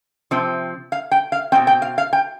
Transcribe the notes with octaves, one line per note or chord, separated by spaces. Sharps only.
C3 F3 C4
F5
G5
F5
B2 G#3 C4 G5
G5
F5
F5
G5